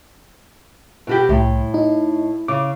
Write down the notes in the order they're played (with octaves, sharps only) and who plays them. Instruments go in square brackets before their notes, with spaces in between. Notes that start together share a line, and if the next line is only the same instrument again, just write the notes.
[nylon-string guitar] B2 F#4 G4
[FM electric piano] C2 [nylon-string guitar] A2
[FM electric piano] D#4
[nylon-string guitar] C#3 [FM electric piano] D6